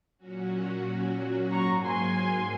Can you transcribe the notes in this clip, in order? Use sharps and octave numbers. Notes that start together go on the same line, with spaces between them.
A#2 F#3 C#4 F#4
G#2 F#3 A#3 A#5 C#6
G#5 C6